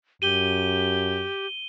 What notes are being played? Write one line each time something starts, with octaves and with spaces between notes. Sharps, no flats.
F#2 G4 D#7 G7